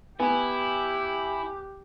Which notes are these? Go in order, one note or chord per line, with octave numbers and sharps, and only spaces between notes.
B3 E4 G4 G#5